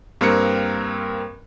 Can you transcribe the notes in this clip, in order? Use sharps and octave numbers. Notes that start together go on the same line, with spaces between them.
G2 A#3 C4 A#4 A#5 C#7